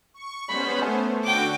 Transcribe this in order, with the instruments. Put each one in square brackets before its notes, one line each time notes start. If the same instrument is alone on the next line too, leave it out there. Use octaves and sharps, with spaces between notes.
[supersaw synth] C#6
[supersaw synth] B3 C#4 C5 [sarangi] B5
[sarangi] A3
[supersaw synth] D3 F#4 [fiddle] G5 D6